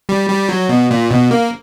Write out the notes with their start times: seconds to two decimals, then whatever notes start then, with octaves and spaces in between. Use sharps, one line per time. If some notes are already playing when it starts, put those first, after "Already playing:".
0.09 G3
0.30 G3
0.49 F#3
0.69 B2
0.91 A#2
1.11 B2
1.31 A#3